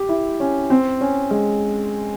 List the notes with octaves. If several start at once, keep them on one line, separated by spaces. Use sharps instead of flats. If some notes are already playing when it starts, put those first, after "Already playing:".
Already playing: G4
E4
C#4
C4
C#4
G#3